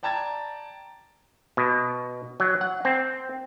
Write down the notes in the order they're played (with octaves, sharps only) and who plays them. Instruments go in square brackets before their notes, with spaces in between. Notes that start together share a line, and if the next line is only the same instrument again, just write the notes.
[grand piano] D5 G5 A5 A#5 G#6 A6
[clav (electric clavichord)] B2
F#3
F#5
C4